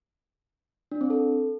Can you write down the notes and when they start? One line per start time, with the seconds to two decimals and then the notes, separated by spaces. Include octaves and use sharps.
0.92 D4
1.01 C4
1.10 A4